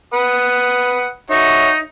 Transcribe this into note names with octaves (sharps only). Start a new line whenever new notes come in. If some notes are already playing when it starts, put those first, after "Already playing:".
B4 F#5 D#6
D#4 F#4 C#5 E5